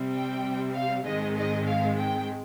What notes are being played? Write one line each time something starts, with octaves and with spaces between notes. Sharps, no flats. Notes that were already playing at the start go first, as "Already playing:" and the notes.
Already playing: C3 G3 C4
G5
F5
G#2 D#3 G#3 C4 D#5
D#5
F5
G5